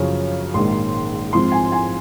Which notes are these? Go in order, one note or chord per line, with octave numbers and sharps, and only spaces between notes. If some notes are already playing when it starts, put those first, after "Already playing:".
Already playing: F#2 C#3 F3 C#5
A#1 G#2 D#3 A#3 C6
G#2 F3 C4 C6
G#5
G#5